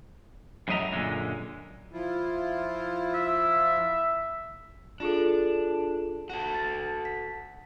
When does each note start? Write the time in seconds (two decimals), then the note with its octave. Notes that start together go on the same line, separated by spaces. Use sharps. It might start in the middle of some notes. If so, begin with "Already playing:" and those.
0.68 F#2 A2 F#3 D#5 E5 A#5
0.91 F#2 A#2 D3 G#3
1.93 F3 E4 F4
3.14 E5
5.00 D4 F4 G#4 A4
6.30 F#4 A4
6.55 A6
7.05 B6